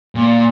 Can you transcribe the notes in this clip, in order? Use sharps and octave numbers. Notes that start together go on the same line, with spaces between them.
A#2